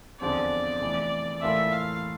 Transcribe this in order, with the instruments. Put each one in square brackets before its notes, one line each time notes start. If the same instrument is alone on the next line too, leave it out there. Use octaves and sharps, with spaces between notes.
[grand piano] E2 D3 F3 C4 [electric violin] D5
[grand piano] F1 F2 E3
[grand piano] A2 E3 A#3 F4 A4 [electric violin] E5
[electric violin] F5